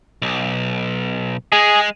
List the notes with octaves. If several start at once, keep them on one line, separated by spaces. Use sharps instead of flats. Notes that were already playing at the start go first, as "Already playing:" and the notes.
B1
G#3 G#4